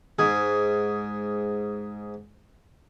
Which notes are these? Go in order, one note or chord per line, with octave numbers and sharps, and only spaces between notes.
G#2 G#4